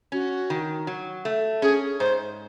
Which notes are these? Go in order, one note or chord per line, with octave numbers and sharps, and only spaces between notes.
C#4 F#4
D#3
F#3
A3
C#4 G#4
G#2 C5